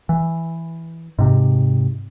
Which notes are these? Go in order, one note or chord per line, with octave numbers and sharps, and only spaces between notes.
E3
G#2 C3